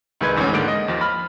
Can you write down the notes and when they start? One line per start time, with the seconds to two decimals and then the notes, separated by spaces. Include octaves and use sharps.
0.21 C2 D#3 G#3 B4 G#6
0.36 D2 G#2 E3 F3 A3 C#4
0.53 D3 D#3 G#3 A#3 F#5 D7
0.68 D#5
0.88 D#2 F3
1.01 B5 F6